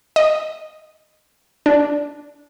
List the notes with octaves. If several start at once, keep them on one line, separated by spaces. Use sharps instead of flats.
D#5
D4